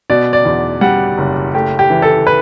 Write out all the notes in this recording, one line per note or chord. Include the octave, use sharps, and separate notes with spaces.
B2 D5
D5
E2
G3 F#5
F#1
A3 G4
G4
E3
A4
B4